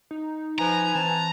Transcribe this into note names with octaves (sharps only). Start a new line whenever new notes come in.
D#4
F3 B4 G#5 A#5
E3 C4 A5